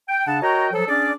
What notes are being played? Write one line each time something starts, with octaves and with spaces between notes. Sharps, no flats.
G5
C#3 D4 F#5 A5
F#4 A#4 C#5 D#5 G5 A#5
F3 F#3 A4
C#4 D4 G#4 D5